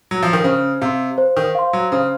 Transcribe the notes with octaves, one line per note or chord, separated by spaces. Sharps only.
F#3
F3
D#3
C#3 C5
C3 F5 C6
C5
D#3
F5 C6
F#3
C#3 C5